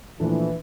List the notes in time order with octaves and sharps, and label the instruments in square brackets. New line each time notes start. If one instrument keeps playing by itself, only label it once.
[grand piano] A#2 F3 A3 D4 [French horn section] E3